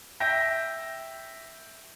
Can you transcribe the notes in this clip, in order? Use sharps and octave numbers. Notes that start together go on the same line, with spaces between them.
E5 G5 G6 A#6